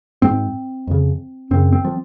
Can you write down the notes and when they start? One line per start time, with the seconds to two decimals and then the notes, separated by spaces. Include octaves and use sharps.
0.22 G#2 C4
0.87 F2 C#3
1.51 F#2 C#3 C4
1.73 C4
1.85 F3